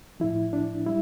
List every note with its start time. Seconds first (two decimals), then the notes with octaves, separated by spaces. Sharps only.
0.20 A2 F3 E4
0.53 D4
0.86 G3 E4